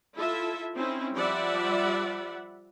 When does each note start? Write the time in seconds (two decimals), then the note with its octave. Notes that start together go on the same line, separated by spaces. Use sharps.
0.16 E4 F4 A4 E5
0.76 C4 C#4 D#4 E4
1.15 F3 G3 D5 E5 F#5 B5